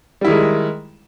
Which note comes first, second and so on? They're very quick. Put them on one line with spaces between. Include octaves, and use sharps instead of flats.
G3 E4 D#3 G#3